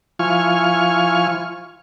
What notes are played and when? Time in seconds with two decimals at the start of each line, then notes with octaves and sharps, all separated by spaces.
0.19 F3 E4 F4 G#5 C#6 F6